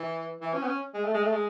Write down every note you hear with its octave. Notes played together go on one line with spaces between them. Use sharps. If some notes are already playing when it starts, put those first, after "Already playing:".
Already playing: E3
E3
C#4
B3
C#4
G#3
A3
G#3
A3
G#3